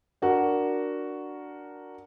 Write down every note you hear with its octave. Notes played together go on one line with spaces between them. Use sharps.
D4 F#4 A#4